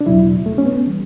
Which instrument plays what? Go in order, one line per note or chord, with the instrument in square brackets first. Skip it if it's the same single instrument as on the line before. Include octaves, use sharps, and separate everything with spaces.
[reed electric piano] D4
E2 B2 F#3 E4
A3
C#4
B3
E3 G3